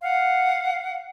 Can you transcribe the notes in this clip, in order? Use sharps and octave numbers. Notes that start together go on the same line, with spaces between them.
F5 F#5